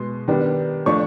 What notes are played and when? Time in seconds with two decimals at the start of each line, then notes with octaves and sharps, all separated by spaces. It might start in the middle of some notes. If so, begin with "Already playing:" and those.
Already playing: B2 G#3 B3 C6
0.28 D#3 G3 B3 D4
0.86 F3 A3 D4 C#5 C#6